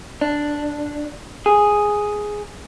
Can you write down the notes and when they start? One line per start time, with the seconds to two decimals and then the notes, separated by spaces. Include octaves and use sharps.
0.21 D4
1.46 G#4